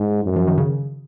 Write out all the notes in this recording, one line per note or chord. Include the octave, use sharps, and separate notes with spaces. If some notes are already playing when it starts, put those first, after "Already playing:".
Already playing: G#2
F#2
F3
D#3
C#3